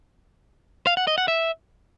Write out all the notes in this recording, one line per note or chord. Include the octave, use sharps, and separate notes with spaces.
F5
F#5
D#5
F#5
E5